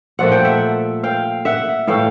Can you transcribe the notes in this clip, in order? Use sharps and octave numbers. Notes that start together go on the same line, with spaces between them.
A#2 F3 A3 F#5
G5
E5 F#5
F5 G5
E5 F#5
A2 E3 A3 F5 G5